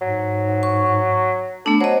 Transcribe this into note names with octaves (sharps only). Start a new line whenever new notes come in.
G#2 F#3
C#6
A3 B3 D4 A4
F#3 C5 D#5